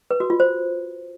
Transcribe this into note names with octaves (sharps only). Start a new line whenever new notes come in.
B4
F#4
F4
C5